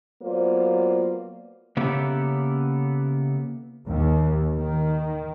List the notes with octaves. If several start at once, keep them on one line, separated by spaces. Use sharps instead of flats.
F#3 A#3 B3 F4 C5 D5
C#3 A#3 B3 E4 G4 A4
D#2
D#3